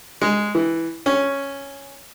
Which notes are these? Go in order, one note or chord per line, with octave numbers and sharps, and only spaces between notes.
G#3
E3
C#4